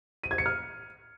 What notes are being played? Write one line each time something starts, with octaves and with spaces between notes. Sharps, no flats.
D#7
G#6
C#7
F6